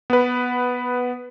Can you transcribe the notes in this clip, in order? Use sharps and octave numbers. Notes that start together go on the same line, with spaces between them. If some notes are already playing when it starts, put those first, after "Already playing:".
B3 B4